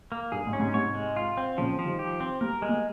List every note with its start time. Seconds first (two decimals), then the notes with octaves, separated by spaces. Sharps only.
0.12 A#3
0.32 G2 G#4
0.47 G#2
0.53 C#4
0.60 G#2 C3
0.73 G#2 C3 C#5
0.95 G#3
1.16 F4
1.37 C4
1.57 A#2 C#3 F3
1.79 F3
1.85 D#3 G3
1.99 G4
2.20 C4
2.41 G3 A#3 A#4
2.62 G#3
2.69 G3 A#3